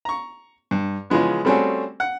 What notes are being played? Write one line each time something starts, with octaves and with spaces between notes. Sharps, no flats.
A#5 C#6
G2
C#3 E3 F3 G#3 B3
G3 A3 C4 C#4 F#4 G#4
F#5